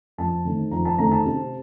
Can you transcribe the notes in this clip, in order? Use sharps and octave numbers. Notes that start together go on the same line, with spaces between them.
F2 A5
D#3 A3 C4
F2 A#5
A5
D#3 A3 C4 A#5
A5
C3